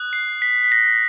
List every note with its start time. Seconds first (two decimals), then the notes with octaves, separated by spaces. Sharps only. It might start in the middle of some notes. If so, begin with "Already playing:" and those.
Already playing: D#6 F#6
0.13 C7
0.42 B6
0.64 B6
0.72 A#6